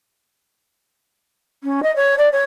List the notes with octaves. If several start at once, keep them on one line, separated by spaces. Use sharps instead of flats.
C#4
D#5
C#5
D5
C#5